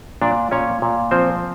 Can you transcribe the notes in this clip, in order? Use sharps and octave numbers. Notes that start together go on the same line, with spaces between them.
A#2 D4 D5
A#2 C#4 C#5
A#2
F3 C4 C5